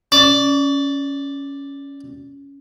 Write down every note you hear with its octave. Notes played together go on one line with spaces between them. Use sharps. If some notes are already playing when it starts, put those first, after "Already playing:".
C#4 D5